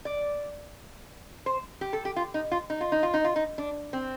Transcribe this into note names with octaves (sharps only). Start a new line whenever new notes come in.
D5
C5
G4
A4
G4
F4
D#4
F4
D#4
F4
D#4
F4
D#4
F4
D#4
D4
C4